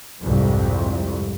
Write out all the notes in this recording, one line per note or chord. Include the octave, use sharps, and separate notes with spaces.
C2 F2 G#2